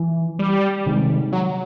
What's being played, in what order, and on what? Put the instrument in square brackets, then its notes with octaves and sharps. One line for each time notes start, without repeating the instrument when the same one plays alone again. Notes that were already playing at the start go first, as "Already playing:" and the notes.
Already playing: [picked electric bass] E3
[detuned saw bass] G3
[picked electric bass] C3 D#3 G#3
[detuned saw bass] F#3